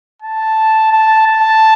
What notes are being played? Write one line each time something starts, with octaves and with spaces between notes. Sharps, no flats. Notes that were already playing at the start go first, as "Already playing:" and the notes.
A5
A5
A5